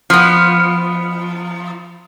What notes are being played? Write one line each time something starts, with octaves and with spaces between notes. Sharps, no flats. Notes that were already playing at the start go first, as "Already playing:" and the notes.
F3 B3